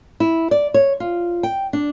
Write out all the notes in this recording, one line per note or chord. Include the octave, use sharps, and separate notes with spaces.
E4
D5
C#5
F4
G5
D4